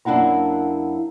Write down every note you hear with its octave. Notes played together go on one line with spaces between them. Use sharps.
F#2 A#3 D4 E4 F#5 A#5